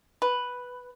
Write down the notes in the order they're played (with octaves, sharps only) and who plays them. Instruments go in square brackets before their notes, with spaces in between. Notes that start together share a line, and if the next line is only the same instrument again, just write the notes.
[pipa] B4